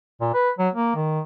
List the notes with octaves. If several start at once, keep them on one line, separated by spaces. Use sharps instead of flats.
A#2
B4
F#3
A#3
D#3